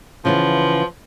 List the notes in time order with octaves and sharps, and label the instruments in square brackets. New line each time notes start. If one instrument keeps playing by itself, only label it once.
[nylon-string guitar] C#3 E3 B3 [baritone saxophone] F3